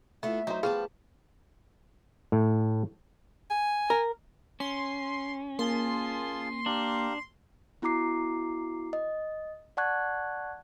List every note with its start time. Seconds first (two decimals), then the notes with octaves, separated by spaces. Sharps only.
0.23 A3 B3 E4 F4 E5
0.47 F#3 D#4 C5
0.63 F3 G3 B3 G#4 A4 F5 A5
2.32 A2
3.50 G#5
3.90 A#4
4.60 C#4 C6
5.59 A#3 F4 G#4 A5 C6
6.66 D4 G4 F5 A#5
7.82 B3 E4 F#4 A#5 D6 C7
8.93 D#5
9.77 D5 F#5 A5 C#6 F#6 G#6